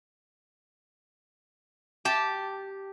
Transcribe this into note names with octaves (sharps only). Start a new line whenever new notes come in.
G4 A5